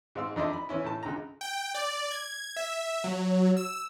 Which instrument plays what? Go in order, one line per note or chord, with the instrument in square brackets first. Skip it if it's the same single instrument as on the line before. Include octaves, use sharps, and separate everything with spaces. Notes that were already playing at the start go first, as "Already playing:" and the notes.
[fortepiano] G#2 C4 F5 E6
F2 D4 D#5 E5 A5
A#5 B5
E3 C#4 E4
A2 A5
C#2 D3 A#5
[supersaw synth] G5
D5
G#6
E5
F#3
E6